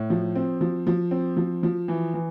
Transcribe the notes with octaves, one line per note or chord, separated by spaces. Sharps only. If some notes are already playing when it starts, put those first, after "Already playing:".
Already playing: A2
F3
C4
F3
F3
C4
F3
F3
E3
E3